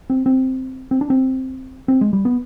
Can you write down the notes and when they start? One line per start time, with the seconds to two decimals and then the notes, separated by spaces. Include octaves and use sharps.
0.10 C4
0.26 C4
0.91 C4
1.01 D4
1.10 C4
1.88 C4
2.01 G#3
2.13 G3
2.25 B3